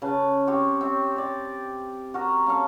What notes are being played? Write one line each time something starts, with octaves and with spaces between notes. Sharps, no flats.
C#3 B4 A5
C4 G4 C#5
C4 C#5 E5
G4 D5
F#4 A#4 A#5
A#3 C#4 A4 F5